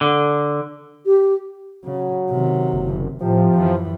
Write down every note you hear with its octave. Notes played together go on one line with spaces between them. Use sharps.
D3
G4
C#3 F#3
C3 D#3
F#1
A2 C3 F3
F#2 E3